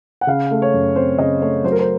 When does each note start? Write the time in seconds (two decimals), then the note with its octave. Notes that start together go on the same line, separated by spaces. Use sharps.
0.21 F#5
0.27 C#3 F5
0.51 A3
0.62 C#5
0.74 F#2
0.95 C4 C5
1.18 C#3 D#5
1.41 A3 C#5
1.64 F#3 C5
1.72 A#4
1.79 C5